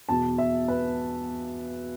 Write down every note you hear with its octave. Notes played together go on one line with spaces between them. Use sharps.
E2 B2 A5
E5
B4